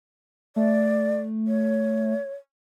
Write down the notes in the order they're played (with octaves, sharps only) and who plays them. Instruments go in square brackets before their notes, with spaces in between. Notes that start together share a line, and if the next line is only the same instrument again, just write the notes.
[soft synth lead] A3 [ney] D5
[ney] C#5